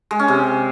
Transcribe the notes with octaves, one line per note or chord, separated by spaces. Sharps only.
G#3
C#4
C3